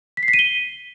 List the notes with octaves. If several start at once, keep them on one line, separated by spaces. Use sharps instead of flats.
B6
C7
B6
D#7
G7